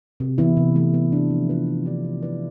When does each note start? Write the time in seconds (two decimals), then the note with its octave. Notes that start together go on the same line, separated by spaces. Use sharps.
0.20 C3
0.38 E3 B3 E4
0.57 C3
0.75 E3 A3 E4
0.94 B3
1.12 D4 G4
1.30 F3
1.49 B3 F4 B4
1.67 B3
1.85 D4 G4 D5
2.05 B3
2.22 E4 B4 D5